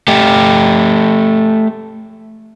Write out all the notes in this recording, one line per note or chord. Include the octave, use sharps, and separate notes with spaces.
A3 G4